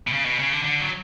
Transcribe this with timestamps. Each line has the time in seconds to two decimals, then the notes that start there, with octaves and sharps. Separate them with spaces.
0.07 B2
0.13 C#3
0.25 B2
0.39 C#3
0.52 D3
0.64 D3
0.80 F#3